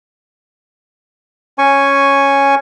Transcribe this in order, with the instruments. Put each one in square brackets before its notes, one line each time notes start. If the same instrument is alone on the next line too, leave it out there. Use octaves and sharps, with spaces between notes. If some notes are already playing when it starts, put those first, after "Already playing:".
[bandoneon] C#4 G#5 C#6